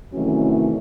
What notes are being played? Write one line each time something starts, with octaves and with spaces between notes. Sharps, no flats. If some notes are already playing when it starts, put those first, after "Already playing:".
C3 D#3 E3 F#3 A3 C#4